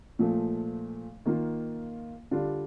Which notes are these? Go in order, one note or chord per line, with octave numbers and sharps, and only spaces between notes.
A#2 F3 A3
D#3 A#3 F4
D3 G3 D4 F4